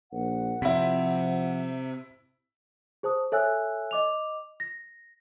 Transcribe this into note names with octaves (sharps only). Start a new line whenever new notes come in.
A#1 F#5
C3 F3 E4 B6
G#4 C5 A5 D#6
A4 C#5 E5 G#5 E6 F#6
D#5 D6 F7
A#6